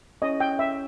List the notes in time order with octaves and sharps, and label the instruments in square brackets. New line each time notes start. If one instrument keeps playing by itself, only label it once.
[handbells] C#4 E4 G#4 C#5 [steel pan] D#5
[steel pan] G5
E5